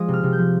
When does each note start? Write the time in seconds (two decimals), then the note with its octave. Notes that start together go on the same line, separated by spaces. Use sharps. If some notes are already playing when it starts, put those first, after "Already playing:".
Already playing: F3 G#3 D#6
0.08 C3
0.14 F6
0.23 C3
0.33 G6
0.38 F3